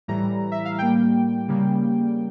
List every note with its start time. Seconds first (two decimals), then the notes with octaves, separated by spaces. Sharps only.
0.08 A2 E3 G3 A#5
0.52 E5
0.65 F5
0.78 A2 G3 A#3 G5
1.48 C#3 G3 A#3